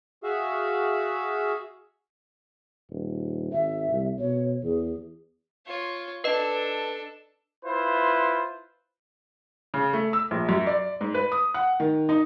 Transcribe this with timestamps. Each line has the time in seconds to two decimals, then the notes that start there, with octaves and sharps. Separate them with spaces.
0.24 F#4 G#4 E5 F5
2.90 D#1
3.52 G#1 E5
3.90 C2
4.19 B2 C#5
4.63 E2 G#4
5.66 F4 C#5
6.24 D4 A4 B4 D#5
7.65 E4 F4 B4 C5
9.74 C#3
9.93 A3
10.13 E6
10.31 A#1
10.49 F#2
10.67 D5
11.01 G#2
11.14 B4
11.32 D#6
11.54 F#5
11.80 D#3
12.09 D#4